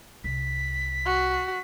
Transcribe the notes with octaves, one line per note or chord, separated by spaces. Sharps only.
C2 B6
F#4